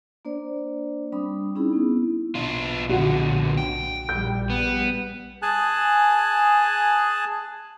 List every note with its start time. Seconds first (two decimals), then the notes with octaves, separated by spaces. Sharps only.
0.25 A#3 D4 C5 D5
1.12 G3 C4 D4 B5 D#6
1.55 C4 C#4 D#4 E4 G#4 B5
1.73 B3 E4
2.35 B1 B2 D4 F4
2.90 A#2 D3 F#4 F#5
3.57 G5
4.09 A#1 G3 G6
4.50 B3
5.42 G#4 G#5 A5 F#6